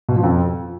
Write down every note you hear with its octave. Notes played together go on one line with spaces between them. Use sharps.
B2
F3
F2